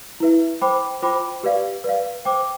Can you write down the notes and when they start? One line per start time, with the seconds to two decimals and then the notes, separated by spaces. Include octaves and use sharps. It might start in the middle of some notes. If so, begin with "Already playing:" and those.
0.20 E4 B4 E5
0.61 C5 G5 B5 D6
1.02 F4 C5 G5 B5 D6
1.43 G4 B4 D5 F5
1.84 B4 D5 F5
2.25 C5 G5 D6